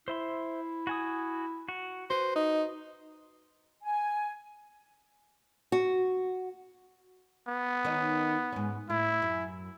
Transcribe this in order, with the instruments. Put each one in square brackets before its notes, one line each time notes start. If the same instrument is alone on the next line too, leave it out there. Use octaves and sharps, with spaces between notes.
[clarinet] E4 [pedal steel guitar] C5 E5 C6
[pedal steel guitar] F#4 G#5 D#6
F#4
[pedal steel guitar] F#4 B4 [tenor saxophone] C5
[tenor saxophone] D#4
[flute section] G#5
[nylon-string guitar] F#4
[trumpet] B3
[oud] D#3 C#4 D#4
G#2 C#4
[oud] A2 [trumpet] E4
[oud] F#2